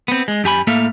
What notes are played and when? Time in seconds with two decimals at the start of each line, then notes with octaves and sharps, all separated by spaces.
0.08 B3 C4
0.28 G#3
0.44 F#2 G4 G#5 B5
0.67 A2 A#3 A4 E5 F5